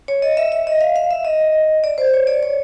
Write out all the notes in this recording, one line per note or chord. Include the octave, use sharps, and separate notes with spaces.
C#5
D#5
E5
E5
D#5
F5
F5
E5
D#5
D5
C5
C#5
D5
C#5